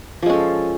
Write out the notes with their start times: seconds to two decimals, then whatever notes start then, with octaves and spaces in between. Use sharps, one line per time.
0.22 F3
0.26 G#3
0.30 C#4
0.33 A4